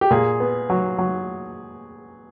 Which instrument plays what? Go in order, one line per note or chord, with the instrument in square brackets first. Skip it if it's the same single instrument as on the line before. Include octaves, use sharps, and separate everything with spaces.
[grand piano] G4
[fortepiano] A#2 [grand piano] G#4
[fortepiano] B3
F#3
F#3